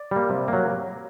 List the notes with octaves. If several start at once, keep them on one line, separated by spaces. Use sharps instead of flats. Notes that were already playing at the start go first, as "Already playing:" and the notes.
Already playing: D5
G3 A#3
C3
F#3 A#3